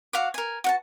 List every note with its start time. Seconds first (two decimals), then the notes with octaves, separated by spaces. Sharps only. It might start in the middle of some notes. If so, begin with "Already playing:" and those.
0.13 F#4 F5 F#5 D6
0.34 A#4 G#5
0.64 F#4 F#5 A5